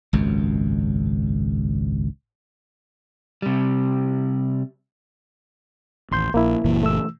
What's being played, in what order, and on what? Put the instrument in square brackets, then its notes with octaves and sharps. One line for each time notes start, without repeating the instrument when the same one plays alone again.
[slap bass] G#1 C#2 F#2
[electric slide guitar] C3 G3
[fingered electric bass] A1 [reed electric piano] D#2 C6 G6
[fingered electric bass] A#1 [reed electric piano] A#3 E4
[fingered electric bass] F#1 A#2 E3
[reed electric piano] A3 E6